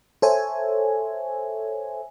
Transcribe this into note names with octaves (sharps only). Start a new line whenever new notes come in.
A4 C5 C#5 E5 G#5